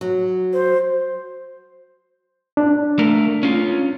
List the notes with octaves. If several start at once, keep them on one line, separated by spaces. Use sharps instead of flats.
F#3
C5
D4
A3 A#4
C#4 F4